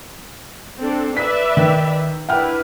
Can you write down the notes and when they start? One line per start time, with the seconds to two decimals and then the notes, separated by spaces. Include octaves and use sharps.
0.81 C4 D4 A4
1.17 B4 D5 E5 B6
1.57 D#3
2.29 D4 E4 B4 F#5 G5 F6